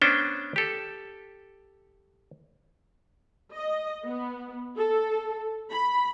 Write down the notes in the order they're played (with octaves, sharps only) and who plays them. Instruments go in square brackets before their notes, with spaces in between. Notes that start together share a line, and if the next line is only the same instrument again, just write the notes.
[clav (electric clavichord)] B3 C#4 D4 C5 G5
G4 A4
[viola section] D#5
B3
A4
B5